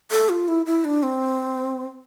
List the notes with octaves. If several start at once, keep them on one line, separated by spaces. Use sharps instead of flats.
A4
F4
E4
E4
D4
C4